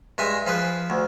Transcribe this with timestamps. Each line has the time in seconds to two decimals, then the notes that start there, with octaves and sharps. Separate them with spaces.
0.18 G2 G#3 E5 G#5
0.46 F3 G#4 B4
0.90 D2